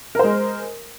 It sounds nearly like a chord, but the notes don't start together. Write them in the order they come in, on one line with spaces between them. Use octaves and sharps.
A#4 C5 G#3